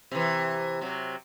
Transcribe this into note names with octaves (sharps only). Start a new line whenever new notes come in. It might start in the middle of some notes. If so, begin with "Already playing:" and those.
C3 E3
C3 F#3